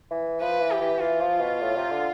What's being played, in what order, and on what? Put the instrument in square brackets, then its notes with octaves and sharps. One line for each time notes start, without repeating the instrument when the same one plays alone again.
[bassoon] E3
[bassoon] F3 [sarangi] B4
[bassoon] E3
[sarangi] G4
[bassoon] E3
[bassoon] E3 [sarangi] F4
[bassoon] F3
B2
A2
C3
D3